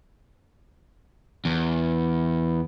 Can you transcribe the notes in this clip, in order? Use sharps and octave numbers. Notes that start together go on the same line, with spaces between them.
E2